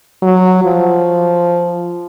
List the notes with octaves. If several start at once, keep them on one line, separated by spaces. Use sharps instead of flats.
F#3
F3